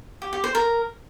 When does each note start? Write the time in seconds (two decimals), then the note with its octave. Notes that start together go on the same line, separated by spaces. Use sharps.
0.22 G4
0.33 G4
0.44 C5
0.55 A#4